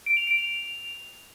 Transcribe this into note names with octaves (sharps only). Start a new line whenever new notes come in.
D7
F7
D7
F7